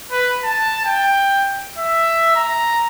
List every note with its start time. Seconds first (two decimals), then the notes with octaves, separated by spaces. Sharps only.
0.11 B4
0.44 A5
0.85 G5
1.78 E5
2.36 A#5